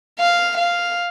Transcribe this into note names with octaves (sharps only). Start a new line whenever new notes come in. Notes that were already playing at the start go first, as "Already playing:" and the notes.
F5
F5